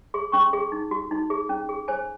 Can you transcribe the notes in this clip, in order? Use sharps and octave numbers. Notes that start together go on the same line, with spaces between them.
G#4 C6
C#4 C#6
C6
G#4
D#4
F#4
D#4
G#4
C#4
G#4
C5 G#5